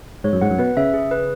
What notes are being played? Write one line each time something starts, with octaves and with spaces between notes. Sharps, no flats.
G#2 C#5
F#2
G#2 F#5
F#2
B2 B4
C#3 E5
G#4
B4